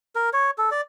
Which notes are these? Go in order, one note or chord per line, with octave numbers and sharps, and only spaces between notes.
A#4
C#5
A4
D5